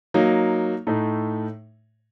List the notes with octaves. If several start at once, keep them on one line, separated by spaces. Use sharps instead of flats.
F#3 A#3 D#4
A2 A3 D#4